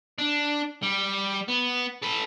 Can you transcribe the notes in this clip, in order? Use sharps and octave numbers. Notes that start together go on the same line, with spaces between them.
D4
G3
B3
A4 B4